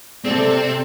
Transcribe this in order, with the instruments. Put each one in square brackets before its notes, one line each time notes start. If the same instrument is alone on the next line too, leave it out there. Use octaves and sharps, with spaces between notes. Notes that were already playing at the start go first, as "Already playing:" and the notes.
[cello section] C3 A4 [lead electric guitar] C4 [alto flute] D5